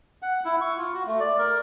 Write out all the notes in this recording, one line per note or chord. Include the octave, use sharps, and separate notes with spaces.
F#5
E4
C#6
F4
F#4
A3
D5
A#4